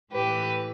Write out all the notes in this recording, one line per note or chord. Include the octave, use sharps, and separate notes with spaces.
A2 E3 G4 B4